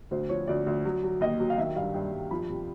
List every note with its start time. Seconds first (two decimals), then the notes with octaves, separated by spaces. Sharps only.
0.11 D2 C5
0.29 F3 C#5
0.47 D2 D5
0.66 D2
0.85 F#3
1.03 F#3
1.21 D#2 D#5
1.40 F#3
1.50 F5
1.58 D#3 E5
1.76 G2 F5
1.94 G2 G5
2.12 G2
2.31 F3 B5
2.49 C3